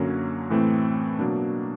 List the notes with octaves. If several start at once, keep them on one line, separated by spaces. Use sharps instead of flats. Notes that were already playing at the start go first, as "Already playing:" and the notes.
Already playing: F#2 D3 F#3 A#3 C#4
A2 E3 A3 C4
B2 F#3 A#3 D4